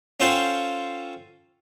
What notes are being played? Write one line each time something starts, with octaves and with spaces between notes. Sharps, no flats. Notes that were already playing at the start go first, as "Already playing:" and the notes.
C#4 F4 A4 C5 F#5 G5